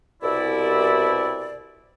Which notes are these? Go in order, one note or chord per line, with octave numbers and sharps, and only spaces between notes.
C2 B2 E4 D5